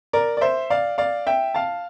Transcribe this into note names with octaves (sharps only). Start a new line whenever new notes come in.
A#4 D5
D5
C5 E5
D5 F5
D5 F5
E5 G5
F5 A5